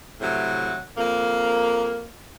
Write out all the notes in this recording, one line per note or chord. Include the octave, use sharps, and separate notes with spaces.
A2 C3 F#3
F2 A#3